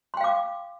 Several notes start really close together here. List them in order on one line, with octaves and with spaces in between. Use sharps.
C6 G5 F5 D6